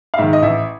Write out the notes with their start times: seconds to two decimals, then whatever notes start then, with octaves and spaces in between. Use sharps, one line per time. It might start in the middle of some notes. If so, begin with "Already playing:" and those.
0.14 F5
0.18 G#2 D#3 E5
0.33 D#5
0.42 A1 E5